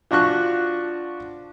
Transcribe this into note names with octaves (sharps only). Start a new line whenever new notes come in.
F3 D4 F#4 C#6 F#6